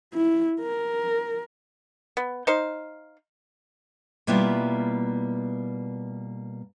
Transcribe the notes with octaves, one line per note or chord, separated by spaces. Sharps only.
E4
A#4
B3
D#4 C5 F5
B2 G3 A#3 B3 E4 F4